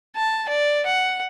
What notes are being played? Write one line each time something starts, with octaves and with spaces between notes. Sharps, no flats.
A5
D5
F#5